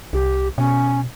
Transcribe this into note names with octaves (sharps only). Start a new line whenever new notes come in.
C2 G4
B2 C#4